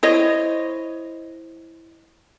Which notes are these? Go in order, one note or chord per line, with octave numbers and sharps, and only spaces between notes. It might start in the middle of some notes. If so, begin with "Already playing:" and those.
E4 C5 C#5 D#5